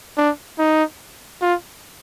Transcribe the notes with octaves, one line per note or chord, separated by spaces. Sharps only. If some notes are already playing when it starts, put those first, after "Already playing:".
D4
D#4
F4